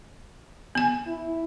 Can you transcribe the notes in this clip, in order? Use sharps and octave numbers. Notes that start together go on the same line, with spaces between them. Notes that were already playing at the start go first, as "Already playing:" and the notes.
B3 G#5
E4